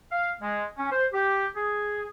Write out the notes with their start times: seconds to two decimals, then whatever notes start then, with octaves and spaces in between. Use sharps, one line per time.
0.11 F5
0.42 G#3
0.77 C#4
0.90 C5
1.12 G4
1.55 G#4